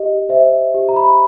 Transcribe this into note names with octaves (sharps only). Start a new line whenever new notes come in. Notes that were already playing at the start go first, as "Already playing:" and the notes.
Already playing: G4 D#5
C5 E5
G4
A#5
B5